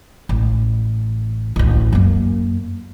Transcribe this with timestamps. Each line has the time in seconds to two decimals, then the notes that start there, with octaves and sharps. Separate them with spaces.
0.29 A1
1.56 A1 D2
1.93 F#2 A#3